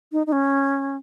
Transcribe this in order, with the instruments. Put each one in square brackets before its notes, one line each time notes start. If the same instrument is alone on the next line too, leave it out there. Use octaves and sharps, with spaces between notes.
[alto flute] D#4
D#4
C#4